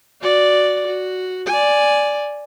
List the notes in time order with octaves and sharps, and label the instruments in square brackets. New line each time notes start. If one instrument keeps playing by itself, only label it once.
[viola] F#4 D5
F#4
D5 G#5